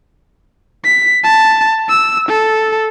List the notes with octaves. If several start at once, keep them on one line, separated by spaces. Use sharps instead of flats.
B6
A5
E6
A4